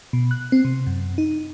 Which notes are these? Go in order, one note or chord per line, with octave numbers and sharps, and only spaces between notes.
B2
F#6
C4
C3
F#2
D#4